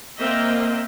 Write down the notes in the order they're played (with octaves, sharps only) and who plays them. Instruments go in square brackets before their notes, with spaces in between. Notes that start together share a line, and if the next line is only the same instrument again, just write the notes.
[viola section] A#3 C4 A#4 D#5 E5 G5